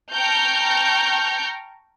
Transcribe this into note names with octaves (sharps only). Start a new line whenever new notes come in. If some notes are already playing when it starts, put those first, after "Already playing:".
G5 A5 A#5 C#6 F6 G6